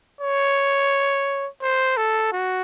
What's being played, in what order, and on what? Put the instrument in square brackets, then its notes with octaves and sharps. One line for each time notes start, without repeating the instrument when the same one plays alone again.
[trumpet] C#5
C5
A4
F#4